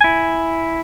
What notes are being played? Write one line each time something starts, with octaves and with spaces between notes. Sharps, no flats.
E4 G#5